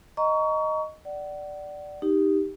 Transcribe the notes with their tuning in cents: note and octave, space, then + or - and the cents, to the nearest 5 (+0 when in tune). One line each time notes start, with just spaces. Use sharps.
D#5 +0 A#5 +0 C#6 +25
D5 +0 F#5 +30
D#4 +0 G4 +0